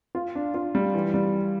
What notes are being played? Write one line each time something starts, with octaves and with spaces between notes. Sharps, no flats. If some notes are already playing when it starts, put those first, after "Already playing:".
F4
D4
F4
G3
E3
G3